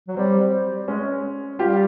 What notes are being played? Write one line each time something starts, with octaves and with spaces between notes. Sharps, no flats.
F#3
G3 C4
G#3 C#4
G3 F4 G4